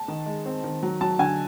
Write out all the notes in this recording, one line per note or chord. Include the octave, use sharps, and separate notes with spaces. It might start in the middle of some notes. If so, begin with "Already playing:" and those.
Already playing: A5
D#3
G#3
C4
D#3
F#3
F#3 A5
D3 G#5